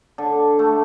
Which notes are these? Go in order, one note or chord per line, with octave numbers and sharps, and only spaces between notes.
D3
A3